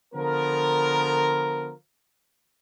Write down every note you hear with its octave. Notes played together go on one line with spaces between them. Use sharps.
D3 F3 B3 A#4